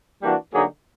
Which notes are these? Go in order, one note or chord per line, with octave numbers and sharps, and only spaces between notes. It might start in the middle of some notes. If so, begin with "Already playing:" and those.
E3 G3 A#3 D4 F#4
D3 F#3 A#3 D#4 G#4